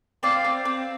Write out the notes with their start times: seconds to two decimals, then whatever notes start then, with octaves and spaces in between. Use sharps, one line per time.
0.23 C4 D5 F5
0.44 C4
0.65 C4